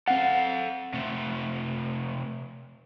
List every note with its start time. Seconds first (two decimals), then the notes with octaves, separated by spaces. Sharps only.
0.08 C4 A4 F5 F#5
0.94 C3 A3